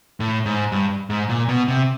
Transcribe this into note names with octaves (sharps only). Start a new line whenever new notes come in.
A2
G#2
G2
G#2
A#2
B2
C3